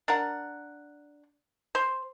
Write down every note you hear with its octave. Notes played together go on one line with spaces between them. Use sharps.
D4 A#4 F#5
C5